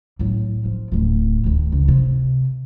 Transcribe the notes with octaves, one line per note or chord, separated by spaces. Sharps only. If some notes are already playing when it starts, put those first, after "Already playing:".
A2 F#3
F3
D1 A2
D2 D#3
C#2
C3